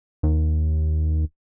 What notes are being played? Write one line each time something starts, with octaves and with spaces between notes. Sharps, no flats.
D#2